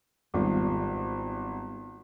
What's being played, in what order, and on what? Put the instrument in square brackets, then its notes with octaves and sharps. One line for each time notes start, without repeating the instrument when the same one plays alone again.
[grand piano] G#1 [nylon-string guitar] G3 B3 F4